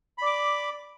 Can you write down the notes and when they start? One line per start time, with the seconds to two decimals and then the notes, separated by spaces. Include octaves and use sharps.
0.18 B5
0.22 D5
0.26 D6